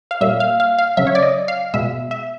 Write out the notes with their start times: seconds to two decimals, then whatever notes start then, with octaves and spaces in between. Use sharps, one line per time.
0.11 F5
0.21 A#2 G3 E5
0.40 F5
0.60 F5
0.78 F5
0.97 C#3 F#3 E5
1.07 C#5
1.15 D5
1.23 D#5
1.48 F5
1.74 B2 G#3 E5
2.11 E5